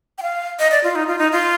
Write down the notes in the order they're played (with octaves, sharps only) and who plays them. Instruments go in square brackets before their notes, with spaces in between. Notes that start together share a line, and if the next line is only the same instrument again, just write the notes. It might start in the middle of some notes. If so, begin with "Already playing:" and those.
[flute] G5
F5
D#5
D5
F4
D#4
F4
D#4
F4